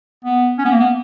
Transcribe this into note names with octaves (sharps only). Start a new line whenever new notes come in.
B3
C#4
B3
A#3
B3